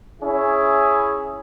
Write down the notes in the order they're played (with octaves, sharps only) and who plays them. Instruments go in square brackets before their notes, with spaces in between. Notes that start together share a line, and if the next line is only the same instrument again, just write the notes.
[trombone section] C#4 E4 G#4